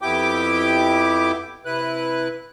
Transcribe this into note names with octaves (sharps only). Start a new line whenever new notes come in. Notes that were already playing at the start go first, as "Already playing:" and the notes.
F2 B3 E4 G4 G5 D6
C3 E4 B4 F#6